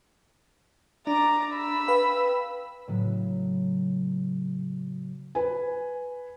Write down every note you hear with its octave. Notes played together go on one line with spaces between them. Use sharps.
D4 D5 A#5
B5 E6
B4 F5 G5
A2 C#3 F#3
B4 G#5